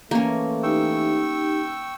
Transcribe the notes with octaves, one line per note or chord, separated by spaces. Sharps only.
E3 A3 A#3 C#4
D#4 G4 G5 C#6 E6